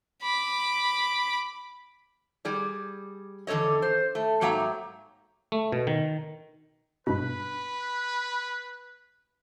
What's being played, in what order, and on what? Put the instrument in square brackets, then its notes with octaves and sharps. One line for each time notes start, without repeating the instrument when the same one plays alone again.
[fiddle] B5 D6
[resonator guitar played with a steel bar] G3 G#4 D5
E2 D3 A4 C#5 D#5
C5
A3
G#2 F#3 A#3 E5 G5 A#5
[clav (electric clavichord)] A3
B2
D#3
[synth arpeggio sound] G2 B2 [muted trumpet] B4 [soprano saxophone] B5